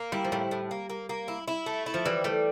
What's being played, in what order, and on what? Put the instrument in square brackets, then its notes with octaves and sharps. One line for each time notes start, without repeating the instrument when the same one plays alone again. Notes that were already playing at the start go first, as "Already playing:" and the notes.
Already playing: [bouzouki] A#3
[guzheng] G3 [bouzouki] E4
[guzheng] F3
[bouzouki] A2 [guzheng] G3
[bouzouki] A2
A#3
A#3
A#3
E4
E4
A3
E4
[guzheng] F3
[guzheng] E3 [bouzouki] G3
[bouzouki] G3 [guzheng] A3